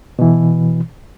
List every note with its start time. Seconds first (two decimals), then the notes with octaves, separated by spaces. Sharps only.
0.19 B2 E3